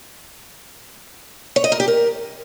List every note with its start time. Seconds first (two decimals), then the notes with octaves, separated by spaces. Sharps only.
1.56 C#5
1.64 D#5
1.72 A#4
1.80 G4
1.88 A#4